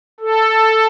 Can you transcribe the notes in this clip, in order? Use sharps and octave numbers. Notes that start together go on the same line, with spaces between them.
A4